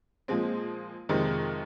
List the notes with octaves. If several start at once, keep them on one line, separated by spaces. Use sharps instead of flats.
A#2 F3 G#3 C4
F2 C3 D#3 G#3 C4